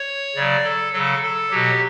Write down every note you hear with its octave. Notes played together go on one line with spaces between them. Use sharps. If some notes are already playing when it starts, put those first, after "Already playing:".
Already playing: C#5
C#3 F#3 D5
A4
C#3 F#3 A4
A4
B2 F#3 G4